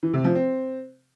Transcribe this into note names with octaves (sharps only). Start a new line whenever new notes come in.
E3
C3
F3
C4